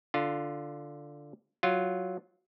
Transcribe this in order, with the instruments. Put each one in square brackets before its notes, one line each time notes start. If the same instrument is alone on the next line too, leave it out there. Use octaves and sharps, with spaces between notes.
[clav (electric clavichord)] D3 F4
F#3 F4